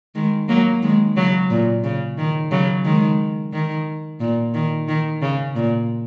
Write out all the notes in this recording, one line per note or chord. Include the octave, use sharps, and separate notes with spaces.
D#3 G#3
F#3 A#3
D#3 G#3
C#3 F#3
A#2
C#3
D#3
C#3 F#3
D#3 G#3
D#3
A#2
D#3
D#3
C#3
A#2